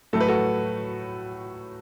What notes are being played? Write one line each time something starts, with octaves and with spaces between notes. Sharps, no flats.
A2 F#3 A3 A4
B4
F#4 A4